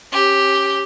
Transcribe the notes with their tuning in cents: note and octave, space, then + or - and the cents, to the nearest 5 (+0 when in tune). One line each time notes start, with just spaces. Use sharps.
C#4 -15 G4 +0